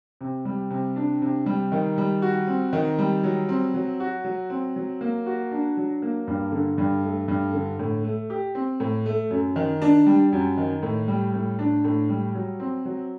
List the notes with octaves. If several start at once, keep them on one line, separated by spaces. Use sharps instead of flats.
C3
G3
C3
D4
C3
G3
D#3
G3
F#4
C4
D#3
G3
F#3
C4
F#3
F#4
F#3
C4
F#3
A#3
F#4
D4
F#3
A#3
G2
D3
G2
A3
G2
D3
A2
A3
G4
C4
A2
A3
F#2
D#3
D4
G3
F#2
D#3
A2
G3
A2
D4
A2
G3
F#3
C4
F#3